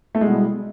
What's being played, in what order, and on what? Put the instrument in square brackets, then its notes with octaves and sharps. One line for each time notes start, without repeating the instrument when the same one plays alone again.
[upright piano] A3
[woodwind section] B2 G3 B3 E4 [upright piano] G#3